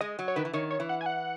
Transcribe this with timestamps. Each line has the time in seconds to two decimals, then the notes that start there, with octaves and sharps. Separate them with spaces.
0.01 G#3 D#5
0.19 F#3
0.28 C#5
0.36 D#3 B4
0.45 E3
0.53 D#3 C#5
0.71 C#5
0.80 E3
0.89 F#5
1.01 G#5
1.06 F#5